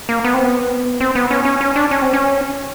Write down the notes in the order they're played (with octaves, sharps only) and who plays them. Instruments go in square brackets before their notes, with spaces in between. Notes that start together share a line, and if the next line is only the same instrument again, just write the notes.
[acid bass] A#3
B3
C4
B3
C4
B3
C#4
C#4
C#4
D4
C#4
C4
C#4